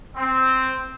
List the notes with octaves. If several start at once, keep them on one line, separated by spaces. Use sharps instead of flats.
C4